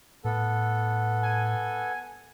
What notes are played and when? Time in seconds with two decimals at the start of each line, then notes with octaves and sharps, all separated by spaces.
0.24 A2 B3 A4
1.23 G#5